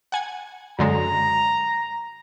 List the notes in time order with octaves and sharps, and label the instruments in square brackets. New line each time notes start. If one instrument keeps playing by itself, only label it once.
[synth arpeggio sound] F#5 G#5 G#6
[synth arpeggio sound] F#2 D3 G#3 [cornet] A#5